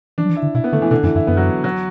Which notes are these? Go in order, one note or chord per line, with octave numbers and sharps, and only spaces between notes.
E3 D4
F#3
E3
E4
D3
B2 E4
B3
D3 A3
E3
B2 D3
F#2 E3
F#2 E4
F#2 B3
F#3
F#3